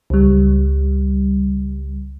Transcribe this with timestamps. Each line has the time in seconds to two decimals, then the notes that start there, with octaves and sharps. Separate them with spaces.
0.10 C#2 G3